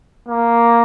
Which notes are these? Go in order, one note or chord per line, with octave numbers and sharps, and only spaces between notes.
A#3